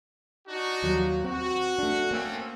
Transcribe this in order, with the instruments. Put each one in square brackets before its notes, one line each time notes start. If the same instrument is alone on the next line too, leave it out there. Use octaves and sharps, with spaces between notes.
[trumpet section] D4 D#4 F#4
[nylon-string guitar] D#2 F3 F#3
[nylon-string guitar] C4 [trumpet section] F#4
[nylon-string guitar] A3 D4
[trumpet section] A3 C4 C#4 [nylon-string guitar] A#3